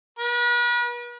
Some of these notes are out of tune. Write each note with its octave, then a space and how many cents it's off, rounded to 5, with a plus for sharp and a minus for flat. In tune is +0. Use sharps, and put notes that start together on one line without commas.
B4 -40